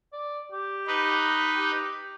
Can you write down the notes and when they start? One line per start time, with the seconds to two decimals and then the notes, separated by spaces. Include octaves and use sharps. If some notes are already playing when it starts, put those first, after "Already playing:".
0.13 D5
0.52 G4
0.87 D#4 B4
1.55 G4